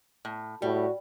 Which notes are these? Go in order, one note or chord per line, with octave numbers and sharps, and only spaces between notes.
A2
A2 G3 F#4